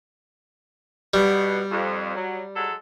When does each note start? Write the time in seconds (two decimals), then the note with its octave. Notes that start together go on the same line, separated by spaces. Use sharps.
1.14 B2 G3
1.71 F2
2.15 F#3
2.55 F#3 G#3 A4